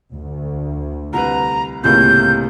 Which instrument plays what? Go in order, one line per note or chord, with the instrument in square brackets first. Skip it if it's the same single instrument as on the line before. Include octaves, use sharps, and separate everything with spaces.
[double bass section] D2
[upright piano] C2 B4 [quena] A#5
[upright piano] C#2 A2 C3 [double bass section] A#3 [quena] G6